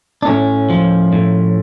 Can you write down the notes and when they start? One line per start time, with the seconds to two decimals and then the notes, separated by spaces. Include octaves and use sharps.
0.22 D4
0.26 A2 C#4
0.70 F3
1.13 A2